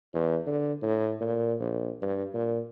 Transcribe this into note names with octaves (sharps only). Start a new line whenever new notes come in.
E2
D3
A2
A#2
A#1
G2
A#2